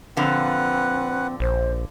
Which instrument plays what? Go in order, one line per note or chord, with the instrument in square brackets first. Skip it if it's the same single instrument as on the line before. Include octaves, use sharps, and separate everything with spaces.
[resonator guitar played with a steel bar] A#2 D3 F3 [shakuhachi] C4 [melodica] B4 F#5
[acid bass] A#1 [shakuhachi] C5